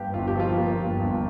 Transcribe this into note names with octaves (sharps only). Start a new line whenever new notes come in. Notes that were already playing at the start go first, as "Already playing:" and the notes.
Already playing: G2 F3 A#3 G4
G1 F4
G4
F3 F4
A#3
G2
G1